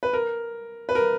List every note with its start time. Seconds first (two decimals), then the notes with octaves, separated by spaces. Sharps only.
0.03 B4
0.13 A#4
0.89 B4
0.95 A#4